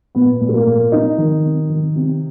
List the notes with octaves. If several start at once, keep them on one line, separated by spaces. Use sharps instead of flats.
A#2 B3
A#2
A3
A#3
A#2
C3 D#4
D#3
C3
D#3
C3